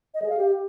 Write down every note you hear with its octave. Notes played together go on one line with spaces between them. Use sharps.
D#5
G#4
F5
G4